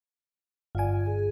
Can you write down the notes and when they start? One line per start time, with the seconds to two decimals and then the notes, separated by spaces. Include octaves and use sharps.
0.75 G1 F4 D5 G#5
1.06 G#4